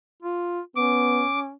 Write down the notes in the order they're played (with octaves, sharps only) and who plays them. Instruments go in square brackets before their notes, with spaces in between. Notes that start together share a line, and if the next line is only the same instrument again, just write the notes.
[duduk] F4
[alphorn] B3 [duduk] C#4 [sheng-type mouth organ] D6